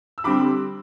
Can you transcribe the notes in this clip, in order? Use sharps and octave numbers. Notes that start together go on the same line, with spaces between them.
E6
D3 G3 C4 B5 D6